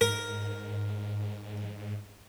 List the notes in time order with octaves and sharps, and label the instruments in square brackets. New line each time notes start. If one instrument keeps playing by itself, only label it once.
[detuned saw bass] G#2 [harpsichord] A#4